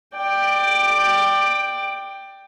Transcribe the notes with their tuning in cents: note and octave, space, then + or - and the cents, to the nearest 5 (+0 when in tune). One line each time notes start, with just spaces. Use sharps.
D5 +20 G5 +0